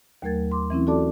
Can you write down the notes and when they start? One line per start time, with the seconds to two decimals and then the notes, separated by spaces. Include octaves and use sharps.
0.22 D#2 F#3 A3 A#4 G#6 A6
0.52 C6 D6
0.70 E3 C4 C#4 E4
0.87 F4 F#4 A4 D5 A5 D6